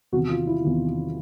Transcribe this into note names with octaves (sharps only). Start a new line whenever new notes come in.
E2 C3 D#3 F#4
F4
E4
E2 C3 D#3